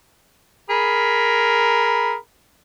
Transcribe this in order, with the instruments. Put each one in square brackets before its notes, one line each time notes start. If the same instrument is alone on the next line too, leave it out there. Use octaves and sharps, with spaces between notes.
[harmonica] G#4 A#4 B5